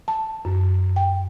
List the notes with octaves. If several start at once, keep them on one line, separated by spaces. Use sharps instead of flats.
A5
F#2
G5